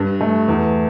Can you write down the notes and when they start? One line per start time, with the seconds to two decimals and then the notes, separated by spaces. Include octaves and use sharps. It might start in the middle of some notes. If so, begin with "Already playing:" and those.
Already playing: G2
0.21 A3
0.48 E2